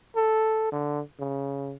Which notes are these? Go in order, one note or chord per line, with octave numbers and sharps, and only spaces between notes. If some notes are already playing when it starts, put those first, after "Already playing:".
A4
D3
C#3